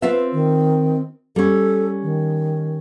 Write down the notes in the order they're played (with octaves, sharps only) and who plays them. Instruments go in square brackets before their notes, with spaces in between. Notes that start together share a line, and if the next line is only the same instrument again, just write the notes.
[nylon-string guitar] C4 F4 E5 [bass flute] B4
[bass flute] D#3
[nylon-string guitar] G3 C#4 [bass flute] A4
[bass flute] D#3